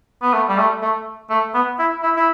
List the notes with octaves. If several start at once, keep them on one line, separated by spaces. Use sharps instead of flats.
B3
A3
G3
A3
A3
A3
B3
E4
E4
E4